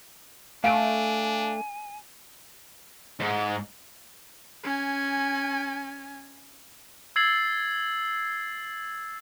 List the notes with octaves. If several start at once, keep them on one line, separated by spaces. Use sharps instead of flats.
A3 D4 F5 G#5 D7
G#2
C#4 G#5
E6 G#6 A6 C7 F#7